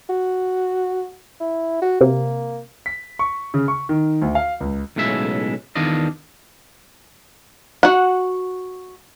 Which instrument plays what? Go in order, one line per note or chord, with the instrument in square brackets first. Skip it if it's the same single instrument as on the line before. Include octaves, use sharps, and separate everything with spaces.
[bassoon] F#4
E4
F#4
[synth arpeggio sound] C3 [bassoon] A#3
[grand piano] B6
C#6
C#3
C#6
D#3
D2
F5
C#2
[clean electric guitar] B1 A2 C#3 G#3 E5
E2 D#3 D4 F4 D5 D#5
[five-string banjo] F#4 F#5